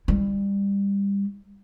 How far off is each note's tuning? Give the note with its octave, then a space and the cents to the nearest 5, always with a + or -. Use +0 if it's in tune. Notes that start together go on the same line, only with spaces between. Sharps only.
G3 +25 E4 +0